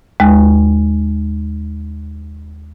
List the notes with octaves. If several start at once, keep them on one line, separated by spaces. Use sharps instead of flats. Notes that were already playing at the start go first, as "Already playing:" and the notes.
D#2 G#3